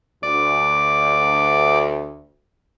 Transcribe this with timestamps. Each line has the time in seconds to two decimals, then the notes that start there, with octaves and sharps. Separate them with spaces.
0.23 D2 D5